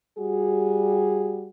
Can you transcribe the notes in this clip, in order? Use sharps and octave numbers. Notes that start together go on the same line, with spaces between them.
G3 F#4 G#4